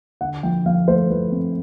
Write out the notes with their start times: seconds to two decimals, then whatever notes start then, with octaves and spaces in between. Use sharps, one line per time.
0.21 D3 F#5
0.43 F3 G5
0.66 F3 F5
0.88 A3 C5
1.10 F3 B4
1.32 C4